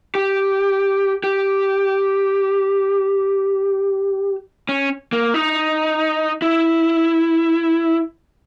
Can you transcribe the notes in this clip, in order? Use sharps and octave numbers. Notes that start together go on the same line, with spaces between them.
G4
G4
C#4
A#3
D#4
E4